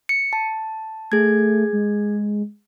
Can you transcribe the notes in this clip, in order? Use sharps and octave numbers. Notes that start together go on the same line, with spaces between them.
C#7
A5
A3 G#4 G#6
G#3